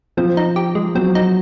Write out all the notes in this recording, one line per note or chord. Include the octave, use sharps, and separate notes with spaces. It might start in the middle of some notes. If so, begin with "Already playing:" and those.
F3 C4
D#4
G4
G#3
F#3 C4
D#4